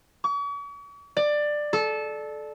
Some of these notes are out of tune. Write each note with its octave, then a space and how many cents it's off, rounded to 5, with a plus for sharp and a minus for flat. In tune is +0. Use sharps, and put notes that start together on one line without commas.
C#6 +45
D5 +15
A4 -20